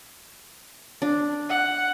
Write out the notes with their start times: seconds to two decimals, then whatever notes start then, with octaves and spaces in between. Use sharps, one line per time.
1.02 D4
1.49 F#5